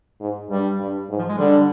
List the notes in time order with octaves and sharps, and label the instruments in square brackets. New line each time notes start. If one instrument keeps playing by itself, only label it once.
[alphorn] G#2
[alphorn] G2 [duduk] G3
[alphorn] G2
G#2
[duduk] F3
G#3
[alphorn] D3 [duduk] G3